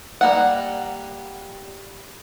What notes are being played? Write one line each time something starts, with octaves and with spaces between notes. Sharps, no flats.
G3 A#3 F#5